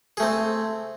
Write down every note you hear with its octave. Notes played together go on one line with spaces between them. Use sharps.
A3 C4 G#4